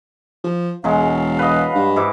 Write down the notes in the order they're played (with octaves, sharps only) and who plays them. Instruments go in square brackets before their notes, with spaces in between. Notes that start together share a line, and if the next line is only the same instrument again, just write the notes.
[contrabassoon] F3
[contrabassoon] E1 [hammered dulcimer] F#3 G#3 [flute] F5
[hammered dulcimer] B4 D#5
[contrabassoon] G2
[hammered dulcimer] G#2 E4 D6